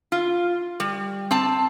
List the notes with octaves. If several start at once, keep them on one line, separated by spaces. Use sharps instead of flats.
F4
G3
C4 A5